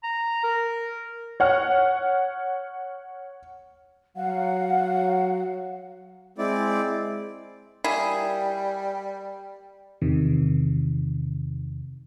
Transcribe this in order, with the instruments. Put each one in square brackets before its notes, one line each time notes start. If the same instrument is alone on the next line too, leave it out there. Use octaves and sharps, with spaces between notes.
[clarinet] A#5
A#4
[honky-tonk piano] C#5 F#5 F6
[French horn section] F#3 [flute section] F5 F#5
[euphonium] G#3 [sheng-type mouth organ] C4 E4 D5
[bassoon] G3 [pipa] A#3 E4 G#4
[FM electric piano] E2 C3 D#3